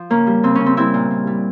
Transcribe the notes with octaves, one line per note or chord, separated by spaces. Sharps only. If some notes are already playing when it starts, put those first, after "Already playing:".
Already playing: F3
C#3 A#3 C#4
G3
C#3 C4
C#3 C#4
C4
G3 C4 E4
A#2
A#2
G3